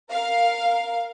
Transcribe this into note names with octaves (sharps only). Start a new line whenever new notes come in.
A#4 F5